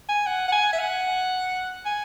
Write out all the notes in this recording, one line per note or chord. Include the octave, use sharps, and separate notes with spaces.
G#5
F#5
F#5
G#5
E5
F#5
G#5